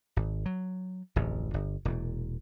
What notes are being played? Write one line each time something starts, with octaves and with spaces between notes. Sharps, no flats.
G#1
F#3
D1 A1 F2
G1
E1 A#2